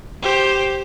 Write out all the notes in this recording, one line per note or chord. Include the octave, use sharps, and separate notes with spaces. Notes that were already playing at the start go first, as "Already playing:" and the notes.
G4 C5